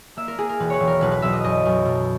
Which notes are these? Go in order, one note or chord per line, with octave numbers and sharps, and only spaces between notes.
A#3 E5
A#4
A#3 G#4
A#4
E1 B4
B4 C#5
E1
A#4
B1 B4
B4
B1 E5
D#5
F#2 D#5
F#2
B2